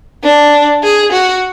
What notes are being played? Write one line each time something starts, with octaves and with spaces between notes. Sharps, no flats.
D4
G#4
F#4